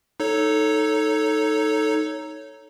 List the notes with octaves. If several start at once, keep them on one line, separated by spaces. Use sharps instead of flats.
D#4 A4 C#5